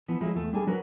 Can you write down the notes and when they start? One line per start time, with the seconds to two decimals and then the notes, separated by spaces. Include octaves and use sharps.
0.08 E3 F3 B3
0.21 F3 F#3 G#3 A3 E4
0.35 E2 A3
0.53 G3 D4 G#4 A4
0.67 F#3 F#4 A#4 B4